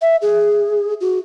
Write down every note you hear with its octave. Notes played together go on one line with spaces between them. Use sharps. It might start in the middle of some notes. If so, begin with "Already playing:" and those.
E5
G#4
F#4